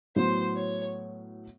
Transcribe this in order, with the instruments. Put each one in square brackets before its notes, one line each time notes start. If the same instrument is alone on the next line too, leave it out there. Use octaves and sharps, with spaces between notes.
[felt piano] A2 F#3 B3 [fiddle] C5
[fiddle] C#5